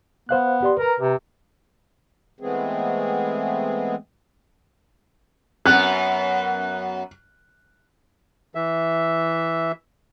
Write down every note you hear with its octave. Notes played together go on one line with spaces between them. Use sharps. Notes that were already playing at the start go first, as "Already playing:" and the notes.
B3 C5 F5 F#6
G4 D5 C6
A#4 B4 A#5
C3
E3 G#3 A3 B3 C4 G#4
F#2 B3 F#6
E3 E5